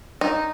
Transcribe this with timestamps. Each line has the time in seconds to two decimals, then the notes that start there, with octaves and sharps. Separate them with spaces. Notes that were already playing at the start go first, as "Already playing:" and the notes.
0.21 D#4